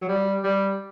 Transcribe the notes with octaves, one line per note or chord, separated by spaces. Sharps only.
F#3
G3
G3